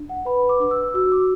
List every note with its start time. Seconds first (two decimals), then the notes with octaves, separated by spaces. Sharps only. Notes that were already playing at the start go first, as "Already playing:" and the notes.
Already playing: D4
0.09 F#5
0.25 B4 B5
0.49 D6
0.60 D4 D6
0.71 E6
0.94 F#4 E6
1.12 D6